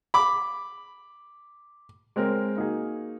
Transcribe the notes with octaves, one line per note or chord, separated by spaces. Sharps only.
B5 D6
G#3 C4 A#4 C#5
A#3 D#4 F#4 G#4